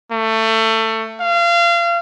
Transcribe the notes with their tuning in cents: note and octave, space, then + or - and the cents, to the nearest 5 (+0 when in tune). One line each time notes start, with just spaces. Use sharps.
A3 +20
F5 -30